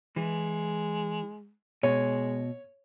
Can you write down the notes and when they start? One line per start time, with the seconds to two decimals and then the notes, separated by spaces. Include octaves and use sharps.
0.16 E3 G#3
1.83 B2 G#3 C#5